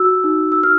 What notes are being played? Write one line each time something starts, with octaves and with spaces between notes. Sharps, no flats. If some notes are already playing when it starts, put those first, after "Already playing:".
Already playing: F#4 E6
D#4
E6
D#4 F6